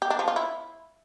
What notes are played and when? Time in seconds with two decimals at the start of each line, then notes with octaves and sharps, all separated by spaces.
0.02 G4
0.10 D4
0.19 F3
0.28 F4
0.36 E4